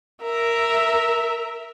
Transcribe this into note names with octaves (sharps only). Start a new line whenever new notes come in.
A#4 E5